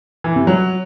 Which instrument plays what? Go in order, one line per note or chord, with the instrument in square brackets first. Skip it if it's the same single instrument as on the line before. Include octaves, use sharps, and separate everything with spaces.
[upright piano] E3
C3
F#3